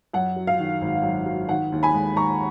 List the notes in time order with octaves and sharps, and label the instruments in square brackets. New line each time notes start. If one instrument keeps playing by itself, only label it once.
[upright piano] F#2 F#5
F#3
F5
D#3
G#1
F#2
F#3
D#3 F#5
D#2
G#5 B5
G#3
D#2 A#5 C#6